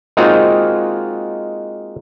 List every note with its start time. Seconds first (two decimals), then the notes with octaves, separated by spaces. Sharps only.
0.17 G#3 A#3 C4 D#4 F4 F#4